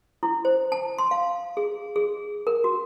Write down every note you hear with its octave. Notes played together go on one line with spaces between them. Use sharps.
E4
C5
A5
C6
F5
G#4
G#4
A#4
F#4